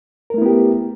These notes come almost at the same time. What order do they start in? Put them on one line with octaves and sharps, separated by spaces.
A#4 A3 E4 B3 G4